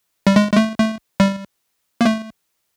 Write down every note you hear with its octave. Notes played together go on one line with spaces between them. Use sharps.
G3
G#3
G#3
A3
A3
G3
A#3
A3